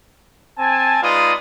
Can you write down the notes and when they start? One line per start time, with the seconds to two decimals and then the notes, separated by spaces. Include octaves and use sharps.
0.58 C4 G#5 A5
1.02 G#3 D#4 F4 B4 D5 D#6